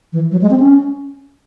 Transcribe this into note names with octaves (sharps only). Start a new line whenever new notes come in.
E3
F#3
G#3
C4
C#4